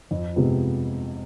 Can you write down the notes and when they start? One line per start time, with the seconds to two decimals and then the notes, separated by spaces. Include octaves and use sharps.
0.11 F2
0.36 C3 G#3 B3